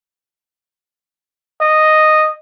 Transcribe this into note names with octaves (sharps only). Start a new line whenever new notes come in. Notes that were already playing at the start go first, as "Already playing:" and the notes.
D#5